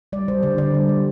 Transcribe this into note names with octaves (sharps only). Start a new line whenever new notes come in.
G3 D5
G3 C5
D3 C5
D3 D5
G3
G3